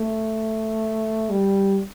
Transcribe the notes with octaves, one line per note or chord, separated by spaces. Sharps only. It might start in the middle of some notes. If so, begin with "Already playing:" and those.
Already playing: A3
G3